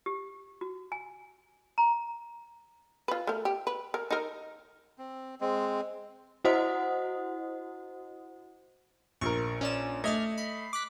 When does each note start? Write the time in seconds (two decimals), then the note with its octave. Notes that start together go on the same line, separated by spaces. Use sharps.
0.06 G4
0.61 F#4
0.92 G#5
1.78 A#5
3.08 F4 B4
3.27 A3 A#4
3.45 G4
3.67 B4
3.94 A#4
4.11 D#4 A#4
4.98 C4
5.41 G#3 C4
6.44 E4 F#4 C5 D#5 F#5 D#6
9.21 A#1 A#4 C#6
9.61 C#4 D5 E7
10.04 A3 D5 D#5 F6 G#6
10.38 B5 C7
10.73 D6 F#6 B6